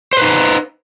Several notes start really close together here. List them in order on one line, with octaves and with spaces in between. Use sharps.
C5 B4 D#4